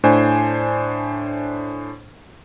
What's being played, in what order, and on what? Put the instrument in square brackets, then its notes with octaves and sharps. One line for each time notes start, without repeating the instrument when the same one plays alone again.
[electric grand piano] A2 D4 C5 G#5